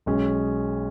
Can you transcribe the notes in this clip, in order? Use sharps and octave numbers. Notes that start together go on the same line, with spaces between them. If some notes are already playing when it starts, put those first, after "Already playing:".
B1 B2 G#3 C#4 G#4